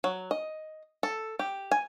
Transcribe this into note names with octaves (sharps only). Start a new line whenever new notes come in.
F#3
D#5
A4
G4
G#5